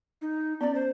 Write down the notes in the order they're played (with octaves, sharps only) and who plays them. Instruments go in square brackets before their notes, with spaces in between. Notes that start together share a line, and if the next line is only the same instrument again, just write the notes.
[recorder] D#4
[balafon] B3 C#4 [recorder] D5
[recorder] C5